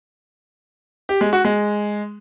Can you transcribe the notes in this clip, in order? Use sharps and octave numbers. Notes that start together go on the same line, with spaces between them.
G4
G#3
F#4
G#3